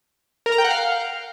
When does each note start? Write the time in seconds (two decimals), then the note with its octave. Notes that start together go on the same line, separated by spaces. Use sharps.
0.46 A#4
0.52 A#5
0.58 G5
0.64 F#5
0.71 F5